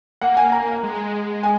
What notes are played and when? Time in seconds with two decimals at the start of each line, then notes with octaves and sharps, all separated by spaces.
0.21 A#3 F#5
0.37 G#5
0.52 A#5
0.83 G#3
1.43 G#5